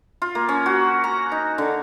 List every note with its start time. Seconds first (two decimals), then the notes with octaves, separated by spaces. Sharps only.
0.22 F4
0.35 A#3
0.49 C#4
0.66 F#4
1.04 A#5
1.32 D#4
1.58 D3